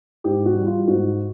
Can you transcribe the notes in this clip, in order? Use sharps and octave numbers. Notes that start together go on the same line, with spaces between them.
G#2 G4
F#4
E3 G3
F4
G#2 F#4